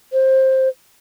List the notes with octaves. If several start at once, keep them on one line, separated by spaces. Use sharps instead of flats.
C5